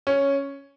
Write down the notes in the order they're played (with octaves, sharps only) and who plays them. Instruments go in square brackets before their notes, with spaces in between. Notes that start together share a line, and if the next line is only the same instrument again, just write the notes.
[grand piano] C#4